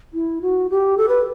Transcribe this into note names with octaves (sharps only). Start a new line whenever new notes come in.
E4
F#4
G4
A4
B4